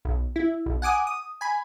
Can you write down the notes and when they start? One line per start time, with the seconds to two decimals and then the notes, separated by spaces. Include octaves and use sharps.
0.05 B1
0.36 E4
0.66 B1
0.82 F#5 G#5 D6 D#6
1.07 D#6
1.41 G#5 B5